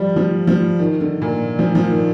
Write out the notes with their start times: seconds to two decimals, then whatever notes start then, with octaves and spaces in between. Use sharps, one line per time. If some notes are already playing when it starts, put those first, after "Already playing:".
Already playing: F3 G3
0.16 F3
0.47 F3
0.79 D#3
1.01 D3
1.22 A#2
1.59 F3
1.75 F3
1.91 D#3